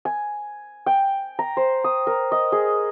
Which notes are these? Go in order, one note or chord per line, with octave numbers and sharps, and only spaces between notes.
G#5
G5
A#5
C5
D#6
A#4
D#5
G#4